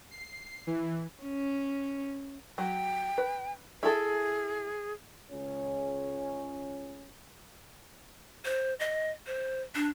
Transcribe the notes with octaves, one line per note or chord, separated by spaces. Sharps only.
C7
E3
C#4
F#3 G5
B4
E4 G#4 A4
C#2 C#4
C5
D#5
C5
D4